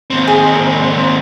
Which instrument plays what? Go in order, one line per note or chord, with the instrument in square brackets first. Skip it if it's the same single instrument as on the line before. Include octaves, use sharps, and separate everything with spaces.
[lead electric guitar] D#2 C4
[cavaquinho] G#4